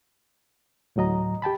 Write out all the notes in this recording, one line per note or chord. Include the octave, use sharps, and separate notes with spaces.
D2 A2 F#3 D#5 A#5
G4 G5 A5 B5